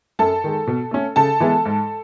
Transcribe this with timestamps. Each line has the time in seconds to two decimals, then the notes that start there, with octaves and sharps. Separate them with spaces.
0.19 F#2 A4 A5
0.44 D#3 G#3
0.67 B2
0.91 A3 C#4
1.16 C#3 A4 A5
1.40 E3 G#3 B3
1.65 G#2